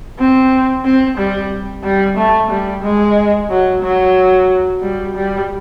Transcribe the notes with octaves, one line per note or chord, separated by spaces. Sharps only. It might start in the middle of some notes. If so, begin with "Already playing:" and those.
C4
C4
G3
G3
A3
G3
G#3
F#3
F#3
G3
G3